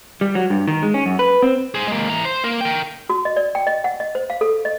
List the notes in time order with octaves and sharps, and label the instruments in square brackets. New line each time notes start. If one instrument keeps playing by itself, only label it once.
[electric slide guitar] G3
F#3
G2
D#3
G#3
C#4
F#2
B4
C4
[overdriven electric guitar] G#4 C5
G#3 A#3
E3 A#5
C5
A#3 A#4
A#4 G5
[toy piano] F#4
D#5
D5
G5
D#5
F#5
D#5
C5
F5
A4
D#5